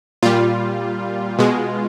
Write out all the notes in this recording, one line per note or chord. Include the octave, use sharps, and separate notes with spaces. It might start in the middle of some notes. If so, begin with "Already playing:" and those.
A#2 G3 F4
B2 G#3